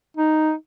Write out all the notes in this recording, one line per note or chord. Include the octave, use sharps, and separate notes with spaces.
D#4